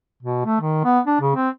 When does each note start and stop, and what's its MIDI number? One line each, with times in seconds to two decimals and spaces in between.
0.23 0.43 47
0.45 0.60 57
0.61 0.80 51
0.84 1.00 59
1.07 1.16 62
1.21 1.34 49
1.35 1.50 60